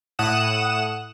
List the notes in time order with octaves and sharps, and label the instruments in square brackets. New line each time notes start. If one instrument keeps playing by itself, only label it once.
[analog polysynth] A2 F#5 D#6 F#6 E7